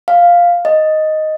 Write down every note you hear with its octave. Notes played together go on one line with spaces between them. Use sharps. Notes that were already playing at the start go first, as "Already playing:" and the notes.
F5
D#5